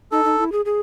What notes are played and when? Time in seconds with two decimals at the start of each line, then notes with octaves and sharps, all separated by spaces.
0.12 D#4 A4
0.25 D#4
0.39 E4
0.52 G#4
0.65 G#4